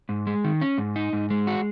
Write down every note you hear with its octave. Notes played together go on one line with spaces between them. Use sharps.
G#2
G#3
D#3
C#4
G#2
D#4
G#2
G#3
F#4